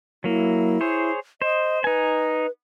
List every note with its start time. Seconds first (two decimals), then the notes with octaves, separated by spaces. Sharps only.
0.24 F#3 A#3 E4
0.81 G#4 C5 C#5
1.42 C5 D#5
1.84 D#4 B4 G#5